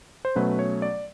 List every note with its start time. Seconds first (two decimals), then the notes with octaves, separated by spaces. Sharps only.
0.25 C5
0.35 B2 F#3 A3 C#4 B4
0.59 C#5
0.82 D5